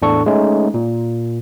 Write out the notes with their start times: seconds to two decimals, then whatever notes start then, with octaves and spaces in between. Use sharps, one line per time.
0.02 E2 A2 D4 A4 C#6
0.26 G#3 A3 C#4 D#4
0.74 A#2